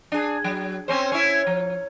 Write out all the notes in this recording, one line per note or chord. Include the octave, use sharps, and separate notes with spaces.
D4 G#4
F#3
C4 C#4 C5
C#4 E4
F3